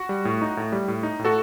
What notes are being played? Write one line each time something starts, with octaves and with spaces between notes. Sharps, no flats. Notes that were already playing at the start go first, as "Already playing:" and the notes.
Already playing: F#4
G3
A2
D#4
A2
G3
A2
D#4
A2
F#4 A4